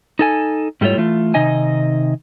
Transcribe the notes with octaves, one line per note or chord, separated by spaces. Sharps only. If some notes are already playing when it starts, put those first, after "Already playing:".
D#4 A4 G#5
G#2 G3 A3 E4 F4 C#5
E3 A3 F4
C3 D#3 D#4 D#5 G#5